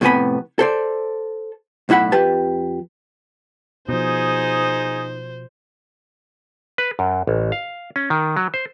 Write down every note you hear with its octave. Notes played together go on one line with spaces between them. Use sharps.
F2 A2 C3 B3 G#5 B5
A4 C5 D5
B1 A2 E4 F#5 B5
F2 G4 B4 A5
B2 F3 D#4 G#4 C5
B4
F#2
A1
F5
C#4
D#3
F#3
C5